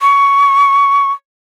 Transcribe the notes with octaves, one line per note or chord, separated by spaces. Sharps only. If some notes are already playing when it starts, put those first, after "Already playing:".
C#6